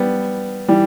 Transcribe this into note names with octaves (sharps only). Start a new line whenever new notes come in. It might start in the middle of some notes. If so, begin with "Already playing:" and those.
Already playing: G3 B3
E3 G3